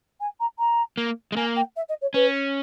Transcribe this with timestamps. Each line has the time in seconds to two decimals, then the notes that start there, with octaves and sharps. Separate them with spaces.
0.20 G#5
0.39 A#5
0.58 A#5
0.97 A#3
1.32 G#3
1.36 A#3 G#5
1.56 G5
1.76 E5
1.88 D#5
2.01 C#5
2.14 C#4 B4